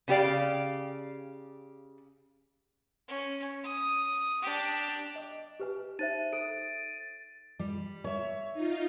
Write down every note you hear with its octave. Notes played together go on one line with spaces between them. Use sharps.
C#3 B3 G4 D5 F5
C#4
D#6
D4 G4
D#5 D6
G4 B4 G#5
D#4 C5 E5 A6 D#7
A4 D7
G3
C#5 E5
D#4 F4